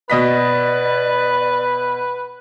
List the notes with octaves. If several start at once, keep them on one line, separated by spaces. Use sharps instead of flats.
B2 B4 D5 D#5 B6